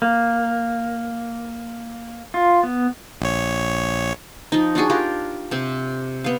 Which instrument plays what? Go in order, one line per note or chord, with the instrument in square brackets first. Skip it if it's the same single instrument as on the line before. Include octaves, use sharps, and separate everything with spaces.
[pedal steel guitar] A#3
F4
B3
[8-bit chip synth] A#1 C#5
[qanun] F3 D#4
D4 F4 F#4 G#4
D4 F4 G4 A#4
C3 C4
B3 F5